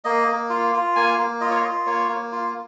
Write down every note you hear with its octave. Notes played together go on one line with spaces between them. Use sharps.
A#3 D#5
A#3
F4
F4
A#3 G#5
A#3
F4 D#5
C#5
D#5
F4
A#3 C#5
A#3
F4